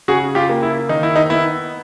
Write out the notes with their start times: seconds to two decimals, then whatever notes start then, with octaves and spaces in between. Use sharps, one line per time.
0.08 C#3 F#4 G#4
0.35 F4 G4
0.49 A#3
0.63 E4
0.89 D#3 D#4
1.03 E4
1.16 D#4
1.30 B3 E4